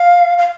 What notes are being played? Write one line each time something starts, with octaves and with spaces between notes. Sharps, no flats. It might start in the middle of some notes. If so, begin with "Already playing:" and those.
Already playing: F5
F5